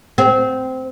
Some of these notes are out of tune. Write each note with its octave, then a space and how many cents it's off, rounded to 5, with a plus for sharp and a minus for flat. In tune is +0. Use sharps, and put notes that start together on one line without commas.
C4 -15